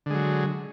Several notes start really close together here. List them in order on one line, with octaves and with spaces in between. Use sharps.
D3 G#3 F#3